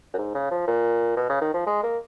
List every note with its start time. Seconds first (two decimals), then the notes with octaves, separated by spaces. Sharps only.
0.14 F#2
0.18 G#2
0.34 C#3
0.51 F3
0.67 A#2
1.16 B2
1.29 C#3
1.41 D#3
1.54 F3
1.66 G#3
1.83 A#3